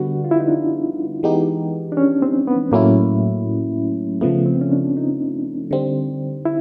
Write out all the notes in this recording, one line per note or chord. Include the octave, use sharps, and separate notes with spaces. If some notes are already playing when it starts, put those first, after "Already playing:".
Already playing: D3 G3 B3 F#4
F4
E4
D#4
D4
E3 G#3 B3 D#4 G4
D4
C#4
C4
B3
A2 F#3 A3 A#3 C#4 E4
C#3 F3 A3 B3
C4
C#4
D4
D#4
D3 G3 C4
E4